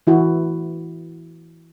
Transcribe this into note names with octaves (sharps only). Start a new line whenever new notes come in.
E3 E4 F#4